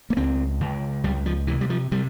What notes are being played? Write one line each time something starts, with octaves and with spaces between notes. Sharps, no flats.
A#3
C#2 C4
C#2
C#2 G3
F3
C3 E3
G3
F3
C3 G3